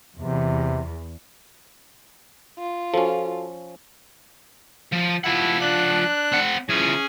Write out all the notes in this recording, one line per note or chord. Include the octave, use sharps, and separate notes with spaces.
E2 C3
F4
F3 C#4 F#4 A4
F3
F3 E4 F#5
D4 F#6
C4 F#5
E3 C#4 F4 G#4 G#5